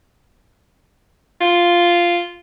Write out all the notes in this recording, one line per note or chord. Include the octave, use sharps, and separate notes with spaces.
F4